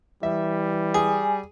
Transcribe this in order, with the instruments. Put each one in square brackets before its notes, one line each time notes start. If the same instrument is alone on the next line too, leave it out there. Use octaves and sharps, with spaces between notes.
[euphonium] E3 [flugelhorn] G3 [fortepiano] E5
[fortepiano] G#4 [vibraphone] G#5